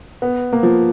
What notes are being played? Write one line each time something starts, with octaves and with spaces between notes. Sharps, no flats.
B3
A#3
F3